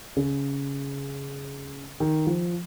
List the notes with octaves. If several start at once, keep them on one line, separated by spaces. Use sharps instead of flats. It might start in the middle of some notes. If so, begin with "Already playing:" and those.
C#3
D#3
F3